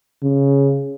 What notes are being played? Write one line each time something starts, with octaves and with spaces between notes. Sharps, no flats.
C#3